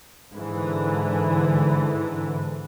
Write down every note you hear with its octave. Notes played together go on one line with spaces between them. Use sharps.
G#2 D3 E3